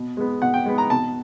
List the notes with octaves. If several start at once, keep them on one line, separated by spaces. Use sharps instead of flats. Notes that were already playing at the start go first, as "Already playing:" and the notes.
Already playing: B2
G#3 B3
B2 F#5
G5
G#3 B3
A#5
B2 A5